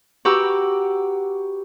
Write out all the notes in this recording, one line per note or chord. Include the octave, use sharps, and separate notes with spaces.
F#4 G4 B4 A#5 D6 E6